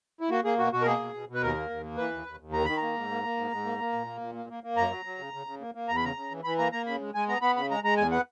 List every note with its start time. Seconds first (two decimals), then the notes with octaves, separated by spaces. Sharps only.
0.21 E4
0.30 A#3 F#4
0.45 A#3 G#4
0.58 B2 F#4
0.73 B2 F#4
0.82 A#4
0.86 A#3 G#4
1.00 B2
1.14 B2
1.28 B2
1.35 B4
1.42 D#2 A#4
1.57 A#3
1.70 D#2
1.83 A#3
1.97 E3 B4
2.12 D#2
2.26 D#2
2.40 D#2
2.53 D#3 A#5
2.65 D#3 B5
2.77 A#5
2.82 A#3
2.95 G#2
3.10 A#3
3.24 A#3
3.37 G#2
3.51 G#2
3.65 A#3
3.79 A#3
3.93 A#2
4.07 A#3
4.21 A#2
4.35 A#3
4.50 A#3
4.63 A#3
4.76 F#2 A#5
4.90 F#3
5.05 F#3
5.18 C#3
5.33 C#3
5.47 C#3
5.60 A#3
5.75 A#3
5.88 E2 A#5
5.96 B5
6.03 C#3 A#5
6.16 C#3
6.31 E3
6.44 E3 B5
6.58 A#3 A#5
6.72 A#3 A#5
6.86 C#3 B5
7.01 G#3
7.15 G#3 G#5
7.29 B3 A#5
7.41 B3 B5
7.56 C#3 B5
7.71 G#3 A#5
7.83 G#3 A#5
7.97 E2 G#5
8.11 B3 F#5